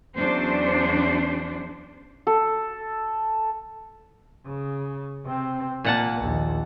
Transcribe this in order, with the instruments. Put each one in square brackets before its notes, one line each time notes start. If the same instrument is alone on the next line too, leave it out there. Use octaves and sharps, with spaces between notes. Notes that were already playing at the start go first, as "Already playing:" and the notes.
[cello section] E2 F#3 C#4 D4 C5
[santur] A4
[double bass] C#3
C3 C4
[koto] A#2 F#5 A5 [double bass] A#3
[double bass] A#1 D#2